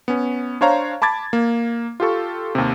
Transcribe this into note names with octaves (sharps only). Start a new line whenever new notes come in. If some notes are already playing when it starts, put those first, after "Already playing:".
B3 C#4
D4 C5 C#5 F5 A#5
A5 B5 D6 G#6 A6
A#3
F4 G4 A4 C#6
D#2 C3